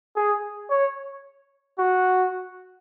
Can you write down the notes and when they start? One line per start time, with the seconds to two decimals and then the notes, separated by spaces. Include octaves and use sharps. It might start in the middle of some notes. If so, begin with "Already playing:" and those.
0.16 G#4
0.70 C#5
1.79 F#4